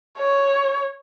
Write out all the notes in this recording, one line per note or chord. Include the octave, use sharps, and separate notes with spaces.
C#5